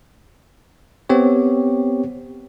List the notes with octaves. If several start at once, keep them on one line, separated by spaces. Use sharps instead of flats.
B3 C4 G4 C#5